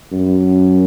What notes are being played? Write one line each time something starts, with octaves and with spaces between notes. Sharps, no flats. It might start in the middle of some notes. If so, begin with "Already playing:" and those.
F#2